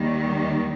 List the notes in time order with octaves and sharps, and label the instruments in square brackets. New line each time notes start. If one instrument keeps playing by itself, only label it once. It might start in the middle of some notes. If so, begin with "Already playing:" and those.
Already playing: [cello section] D#2 D#3 G3